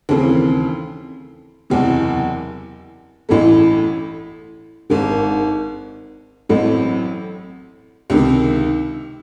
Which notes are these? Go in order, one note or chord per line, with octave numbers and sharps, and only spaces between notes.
D#2 C#3 E3 A3 C4
F#1 E2 C3 E3
A1 A2 E3 A3
G#1 G#2 D#3
A1 A2 F#3 A3 C4
C#2 C3 D#3